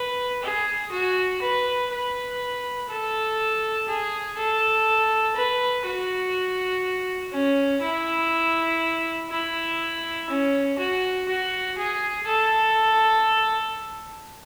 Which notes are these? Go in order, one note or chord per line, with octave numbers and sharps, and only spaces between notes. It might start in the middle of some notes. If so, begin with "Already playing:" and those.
Already playing: B4
G#4
F#4
B4
B4
A4
G#4
A4
B4
F#4
C#4
E4
E4
C#4
F#4
F#4
G#4
A4